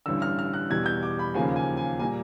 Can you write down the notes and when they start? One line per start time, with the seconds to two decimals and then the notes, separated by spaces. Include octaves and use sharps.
0.06 A1 G2 D3 E6
0.22 F6
0.39 F6
0.54 F#6
0.70 E2 B2 G3 G#6
0.86 G6
1.03 D6
1.19 B5
1.34 D#2 C#3 F3 A#3 G#5
1.56 G#5
1.77 G#5
1.99 A#2 G3 A#3 G#5